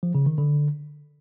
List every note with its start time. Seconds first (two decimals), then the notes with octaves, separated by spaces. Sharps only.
0.03 F3
0.15 C#3
0.26 D#3
0.38 D3